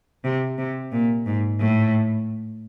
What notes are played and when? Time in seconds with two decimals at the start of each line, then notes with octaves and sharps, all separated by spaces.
0.24 C3
0.58 C3
0.92 A#2
1.26 G#2
1.60 A2